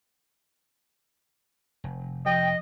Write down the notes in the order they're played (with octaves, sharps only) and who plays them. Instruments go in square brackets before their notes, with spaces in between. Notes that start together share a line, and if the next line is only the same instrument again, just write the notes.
[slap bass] F1
[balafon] F3 [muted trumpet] D#5 [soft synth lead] G5